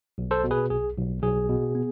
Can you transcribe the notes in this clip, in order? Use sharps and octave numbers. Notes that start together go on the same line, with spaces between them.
B1
A4 C5
B2
G#4 B4
B1 G#4
B1
B1 G#4
B2
B3